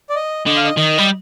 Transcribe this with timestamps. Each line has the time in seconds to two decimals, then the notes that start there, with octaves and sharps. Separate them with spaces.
0.10 D5
0.15 D#5
0.46 D3 D#5
0.57 F5
0.65 D#5
0.77 D#3 D#5
0.98 G3